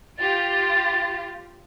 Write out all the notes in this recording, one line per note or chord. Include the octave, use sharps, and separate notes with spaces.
F4 G4 A6